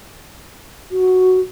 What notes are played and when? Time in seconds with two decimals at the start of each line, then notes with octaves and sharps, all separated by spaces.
0.91 F#4